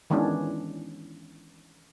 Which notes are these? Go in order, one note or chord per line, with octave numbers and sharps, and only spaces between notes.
D#3 E3 G#3 B3 C#4 D4